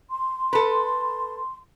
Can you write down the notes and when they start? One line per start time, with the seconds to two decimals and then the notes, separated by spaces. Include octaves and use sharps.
0.10 C6
0.53 A4 B4